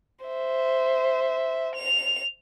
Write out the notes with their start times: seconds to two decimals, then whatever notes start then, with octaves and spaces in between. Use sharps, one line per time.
0.25 C5 E5
1.75 F7